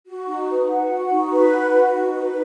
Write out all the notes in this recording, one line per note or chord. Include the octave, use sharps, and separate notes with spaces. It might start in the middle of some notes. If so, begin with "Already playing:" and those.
F#4
D#4
B4
F#5
F#4
D#4
B4
F#5
F#4
D#4
B4